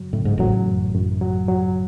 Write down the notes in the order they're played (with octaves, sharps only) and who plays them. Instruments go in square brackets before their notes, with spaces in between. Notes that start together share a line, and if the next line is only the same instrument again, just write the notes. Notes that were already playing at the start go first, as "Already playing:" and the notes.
Already playing: [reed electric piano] F#2 C#3 F#3
[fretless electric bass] A2 [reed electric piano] C#3
[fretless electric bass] G#2
[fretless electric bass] A1 A2 [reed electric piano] F#3
[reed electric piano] F#2
F#2
F#3
F#3